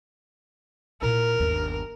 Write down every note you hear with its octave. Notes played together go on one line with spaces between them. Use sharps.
A#2 E4 A#4
G1 D#2